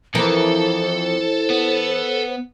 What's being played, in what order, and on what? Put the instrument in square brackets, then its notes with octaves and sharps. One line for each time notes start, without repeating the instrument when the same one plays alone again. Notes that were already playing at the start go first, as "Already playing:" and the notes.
[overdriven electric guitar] F2 [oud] E3 A#4 [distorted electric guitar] A4 [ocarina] C5
[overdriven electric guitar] B3